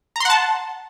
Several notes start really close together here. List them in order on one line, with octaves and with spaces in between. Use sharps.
A#5 C6 F#5 A5